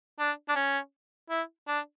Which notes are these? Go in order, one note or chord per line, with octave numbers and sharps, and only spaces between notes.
D4
D4
C#4
E4
D4